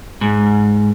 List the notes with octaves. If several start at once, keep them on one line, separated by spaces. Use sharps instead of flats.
G#2